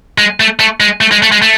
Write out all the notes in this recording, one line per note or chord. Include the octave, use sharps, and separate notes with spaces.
G#3
A3
A3
G#3
A3
G#3
A3
G#3
A3